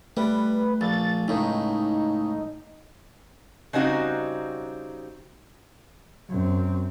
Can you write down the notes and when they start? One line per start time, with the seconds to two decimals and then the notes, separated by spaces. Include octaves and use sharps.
0.17 G3 A3 B4
0.81 A#1 A6
1.28 C#2 A2 D#4
3.73 C#3 G3 C4 D#4 F#4 A#5
6.29 F#2 C4